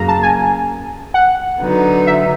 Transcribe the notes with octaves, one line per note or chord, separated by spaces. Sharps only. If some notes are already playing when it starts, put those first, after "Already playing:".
Already playing: F#2 C#3 F#3 A#3 A#5
A5
G#5
F#5
D3 F#3 B3 D#4
E5